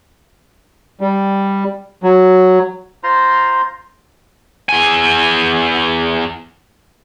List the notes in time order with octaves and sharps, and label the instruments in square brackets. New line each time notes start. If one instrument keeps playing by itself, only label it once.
[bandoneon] G3
F#3
[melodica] F4 C5 A#5 C6
[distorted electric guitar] E2 G#5